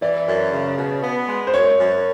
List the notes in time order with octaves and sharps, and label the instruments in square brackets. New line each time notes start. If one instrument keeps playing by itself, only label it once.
[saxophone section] E3 [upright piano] D5
[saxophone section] F#2
C#3
B2
B3
G#3
[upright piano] C5
[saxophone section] F#2 [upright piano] C#5
[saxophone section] F#2